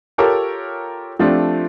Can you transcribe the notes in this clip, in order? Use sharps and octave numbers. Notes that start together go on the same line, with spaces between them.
F4 G4 A4 A#4 C#5
F3 A3 C4 D4 F4 G4